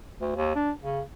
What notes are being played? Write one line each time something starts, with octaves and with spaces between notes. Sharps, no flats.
D2
D#2
D4
C#3